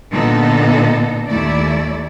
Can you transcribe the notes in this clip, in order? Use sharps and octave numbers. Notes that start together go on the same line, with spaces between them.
A#2 D3 B3 D#4 A4
D#2 A3 E4 D5